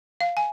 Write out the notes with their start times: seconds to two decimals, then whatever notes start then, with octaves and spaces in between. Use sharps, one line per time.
0.21 F5
0.37 G#5